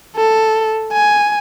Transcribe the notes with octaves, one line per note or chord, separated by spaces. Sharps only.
A4
G#5